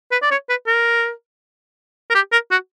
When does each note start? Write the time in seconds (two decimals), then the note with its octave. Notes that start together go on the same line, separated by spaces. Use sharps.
0.12 B4
0.22 D5
0.31 C#5
0.49 B4
0.67 A#4
2.10 A#4
2.14 G4
2.32 A#4
2.51 F#4